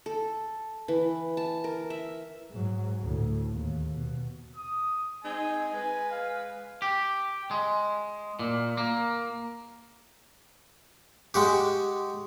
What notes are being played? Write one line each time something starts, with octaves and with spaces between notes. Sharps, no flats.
A4
E3
A5
A#4
E5
G#2 F#3
D2 A2
D#2
B2
D#6
G#3 C4 D#4 G#5
G#3 B4 G#5
F5
G4
G#3
A#2
A#3
G#3 F#4 G4